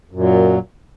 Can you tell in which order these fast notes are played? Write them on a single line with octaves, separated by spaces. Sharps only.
F#2 A#2 F#3